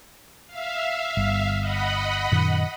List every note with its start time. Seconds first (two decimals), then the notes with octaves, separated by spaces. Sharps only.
0.47 E5 F5
1.17 G1
1.59 D#5 F#5 B5
2.32 F#2 A#2 D#3